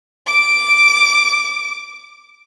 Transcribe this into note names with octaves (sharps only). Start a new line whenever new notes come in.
D6 D7